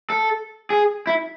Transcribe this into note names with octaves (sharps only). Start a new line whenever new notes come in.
A4
G#4
E4